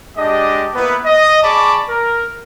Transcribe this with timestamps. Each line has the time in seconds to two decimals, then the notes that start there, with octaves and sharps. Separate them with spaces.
0.18 G#3 D4 G4 D#5
0.75 A#3 B3 E4 B4
1.05 D#5
1.43 G#4 D5 A5 B5 C#6 D6
1.89 A#4